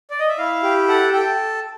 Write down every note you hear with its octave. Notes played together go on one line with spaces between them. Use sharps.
D5
D#5
E5
E4 F5
G4
A4 F#5
A4 G5